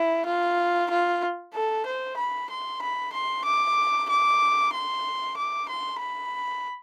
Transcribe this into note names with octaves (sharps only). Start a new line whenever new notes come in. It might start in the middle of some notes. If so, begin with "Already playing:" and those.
Already playing: E4
F4
F4
A4
C5
B5
C6
B5
C6
D6
D6
C6
D6
C6
B5